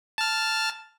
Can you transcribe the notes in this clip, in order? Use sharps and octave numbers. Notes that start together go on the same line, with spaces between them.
A5 F6